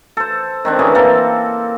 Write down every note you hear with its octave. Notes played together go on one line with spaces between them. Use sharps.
A4 C5
D#3 C4 D4
D3 E3 C#4 G#4
A#3 C4 A4